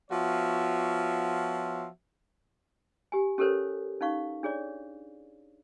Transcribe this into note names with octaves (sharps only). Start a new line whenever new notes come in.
F3 B3 F4 F#4 C#5 E5
G4 G#5
C#4 G4 A4 A#4 C5 C#5
C#4 D#4 F5 C#6
D4 G#4 C#5 D5